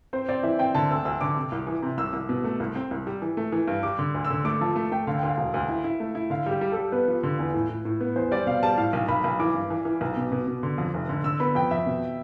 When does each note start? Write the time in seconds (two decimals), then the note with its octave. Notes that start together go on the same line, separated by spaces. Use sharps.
0.13 C4 C5
0.28 C4 D5
0.43 E3 E5
0.59 C4 G5
0.74 D3 A5
0.90 D2 E6
1.05 D2 E6
1.21 D3 D6
1.36 C3
1.52 C2
1.67 E3
1.82 C3
1.98 C2 E6
2.13 C2
2.29 B2
2.44 A3
2.60 C2
2.75 C4
2.91 C2
3.07 G3
3.22 E3
3.37 A3
3.52 E3
3.68 G2
3.83 G3 D6
3.99 D3
4.14 D2
4.25 E6
4.30 D3
4.45 A3 D6
4.61 F3 A5
4.76 A3
4.92 A3 G5
5.07 D3 F5
5.17 G5
5.23 D2
5.29 F5
5.38 E1
5.54 D2
5.69 E4
5.84 E4
6.00 A3
6.15 E4
6.30 D3 F5
6.46 G3 G4
6.61 G3
6.72 A4
6.77 G3
6.92 B3 B4
7.08 F3
7.23 D3
7.39 E2
7.54 A2
7.69 A2
7.85 A2
8.00 B3
8.16 E2 C5
8.31 G3 D5
8.47 B2 F5
8.63 G3 A5
8.77 A2 F5
8.93 B1
9.08 B1 B5
9.24 B1
9.39 E3 D6
9.55 G2
9.70 E3
9.85 E3
10.01 B1
10.17 B2
10.32 B2
10.47 B2
10.63 D3
10.78 F2
10.94 F1
11.09 D3
11.24 D3 E6
11.40 B3 B5
11.55 F2 G5
11.71 F2 E5
11.86 B2